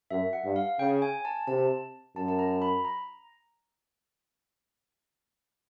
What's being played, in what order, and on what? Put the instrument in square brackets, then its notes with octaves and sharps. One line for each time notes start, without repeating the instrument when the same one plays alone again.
[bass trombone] F#2 [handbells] E5
[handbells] F#5
[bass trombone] G2
[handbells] F5
[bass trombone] C#3 [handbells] G5
[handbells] G#5
A5
[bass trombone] C3 [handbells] A5
[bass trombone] F#2 [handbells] A5
[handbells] A5
A#5
B5
A#5